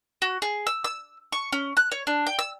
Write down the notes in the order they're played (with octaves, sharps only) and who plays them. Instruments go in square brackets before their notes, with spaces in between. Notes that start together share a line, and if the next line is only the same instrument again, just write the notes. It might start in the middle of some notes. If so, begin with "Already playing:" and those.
[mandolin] F#4
G#4
E6
E6
C#6
C#4
F#6
C#5
D4
G5
E6